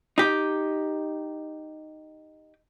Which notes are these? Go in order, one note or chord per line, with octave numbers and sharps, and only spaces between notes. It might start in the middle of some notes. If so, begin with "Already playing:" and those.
D#4 G4